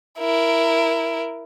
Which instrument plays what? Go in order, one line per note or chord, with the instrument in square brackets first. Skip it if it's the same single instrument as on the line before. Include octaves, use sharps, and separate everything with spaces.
[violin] E4 A#4